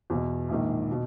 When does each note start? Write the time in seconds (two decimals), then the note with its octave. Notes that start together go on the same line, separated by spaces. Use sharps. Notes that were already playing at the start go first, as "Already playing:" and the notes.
0.10 E2 B2
0.49 A#1 G#2 D#3
0.91 B2